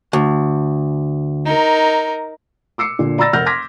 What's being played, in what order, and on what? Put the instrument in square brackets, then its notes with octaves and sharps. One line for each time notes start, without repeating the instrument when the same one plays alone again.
[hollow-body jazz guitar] D2
[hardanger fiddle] D#4 A#4
[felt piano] D6 E6 C7 C#7
A#2 D3
D5 A#5 B5 E6 A6 A#6
F1 A#4 F#5 F6 G6 A#6
C6 D6 F6 G#6 A#6 B6